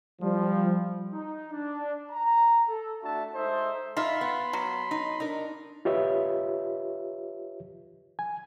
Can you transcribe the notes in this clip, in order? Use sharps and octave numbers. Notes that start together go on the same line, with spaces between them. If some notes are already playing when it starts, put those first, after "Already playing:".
F3 G3
D#4
D4
A#5
A4
A3 D4 E4 F#4 E5 A5
G#3 D#4 A4 C5 D#5 E5
D#4 F4 E5 B5 C6
B3
F#3
D#4
D4 D#4 A#4
F4 G4 B4 C#5 D#5 E5
G#5